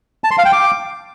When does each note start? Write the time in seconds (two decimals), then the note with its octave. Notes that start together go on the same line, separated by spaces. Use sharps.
0.24 A5
0.31 C6
0.38 F5
0.45 G5
0.52 D6